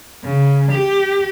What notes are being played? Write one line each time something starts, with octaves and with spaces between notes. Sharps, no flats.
C#3
G4